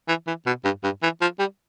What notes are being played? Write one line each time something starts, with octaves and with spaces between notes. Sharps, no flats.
E3
E3
B2
G2
G2
E3
F3
G3